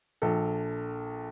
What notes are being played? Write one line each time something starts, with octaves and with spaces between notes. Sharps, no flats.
A#1 A4